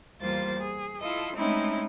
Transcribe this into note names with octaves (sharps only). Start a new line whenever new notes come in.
E2 G3 A#3 F4 C5 A6
G#4
E4 F4 A4 D#5
G#3 A3 C4 C#4 D#4 E4